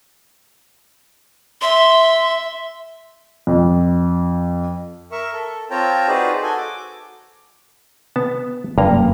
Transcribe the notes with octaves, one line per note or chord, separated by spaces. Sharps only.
E5 C6
F2
A#4 E5 C#6
A4
C4 F4 C#5 G5 A5 A#5
D#4 F#4 G#4 B4 C5 D5
F#4 A4 G#5
D6
B3 A5
F#1 G2 A#3 A#5